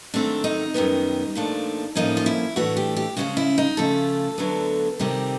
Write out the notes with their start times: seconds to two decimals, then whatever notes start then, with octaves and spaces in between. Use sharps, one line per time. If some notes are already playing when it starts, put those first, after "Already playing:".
0.14 G#2 D#3 F#3 A3 C4 D4
0.44 D#4
0.74 F#2 D#3 G3 B3
1.35 A#2 F3 A3 D4
1.95 A2 F3 A#3 C#4 D#4
2.17 F4
2.26 E4
2.56 A2 E3 A3 D4 F#4
2.77 G4
2.96 G4
3.17 C#3 F3 G#3 C#4 F#4
3.37 E4
3.58 D#4
3.77 C#3 F3 A3 A4
4.38 D2 D3 F#3 B3
4.99 C3 D#3 G3 C4